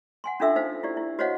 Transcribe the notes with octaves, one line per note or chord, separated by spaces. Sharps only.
F#5 G#5 C6
C#4 D4 F4 A4 E5 E6
D#4 C5 F5
E4 G4 D5
E4
F#4 C5 C#5 D#5 F5 F#5